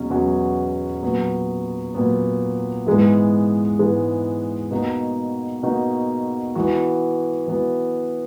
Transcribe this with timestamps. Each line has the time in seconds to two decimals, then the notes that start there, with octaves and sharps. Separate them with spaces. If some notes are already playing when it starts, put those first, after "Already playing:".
Already playing: E2 B2 F#3 C#4 F#4
0.10 E2 B2 F#3 C#4 F#4
1.03 A#2 F#3 B3
1.95 A#2 F#3 B3
2.86 G#2 E3 G#3 B3
3.79 G#2 E3 G#3 B3
4.71 B2 A#3 D#4 F#4
5.63 B2 A#3 D#4 F#4
6.55 E3 B3 F#4
7.48 E3 B3 F#4